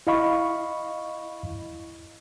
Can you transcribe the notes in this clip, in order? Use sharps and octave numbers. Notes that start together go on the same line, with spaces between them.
E4 D#5 F5 B5 C#6